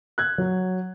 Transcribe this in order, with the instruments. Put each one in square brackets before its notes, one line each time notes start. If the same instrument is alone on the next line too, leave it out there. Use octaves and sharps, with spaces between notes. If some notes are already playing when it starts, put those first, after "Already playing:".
[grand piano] F#6 G#6
F#3